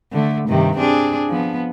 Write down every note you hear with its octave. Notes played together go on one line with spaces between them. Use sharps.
D3 A3
G2 C3 D#3
C4 D4 G#4
F3 B3